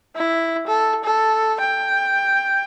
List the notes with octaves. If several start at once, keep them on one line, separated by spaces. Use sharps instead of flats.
E4
A4
A4
G5